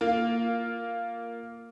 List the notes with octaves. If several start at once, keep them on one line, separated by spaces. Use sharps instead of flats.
A#3 F4